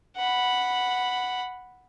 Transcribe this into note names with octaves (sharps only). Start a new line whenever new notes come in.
F#5 B5